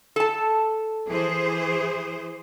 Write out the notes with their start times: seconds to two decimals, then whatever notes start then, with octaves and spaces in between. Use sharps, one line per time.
0.16 A4 A5
1.07 E3 G#4 C5